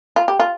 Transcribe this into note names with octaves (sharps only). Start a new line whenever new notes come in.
F4
G4
F4